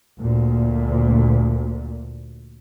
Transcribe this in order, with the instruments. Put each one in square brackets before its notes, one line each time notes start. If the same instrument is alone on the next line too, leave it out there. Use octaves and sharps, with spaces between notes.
[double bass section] D2 A#2